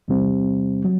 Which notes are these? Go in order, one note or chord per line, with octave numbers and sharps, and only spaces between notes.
E2 C3 G3 C4
F#3